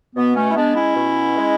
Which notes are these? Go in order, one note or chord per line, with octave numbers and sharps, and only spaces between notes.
B2 B3
A3 C#4
E4
G#3 B3 D4
C#4 E4
B2
G#3